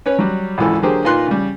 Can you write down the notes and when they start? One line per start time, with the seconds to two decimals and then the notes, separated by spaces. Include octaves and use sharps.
0.06 C#4 B4 C#5
0.19 F#3 G3
0.58 G#1 C#2 E3 A4
0.82 D3 F#3 A#3 G4 G#4 C5
1.04 A#2 D#4 F4 B4 C6 F#6
1.27 C#3 G3